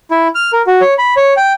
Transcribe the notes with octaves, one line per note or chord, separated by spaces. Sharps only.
E4
F6
A#4
F#4
C#5
B5
C#5
G5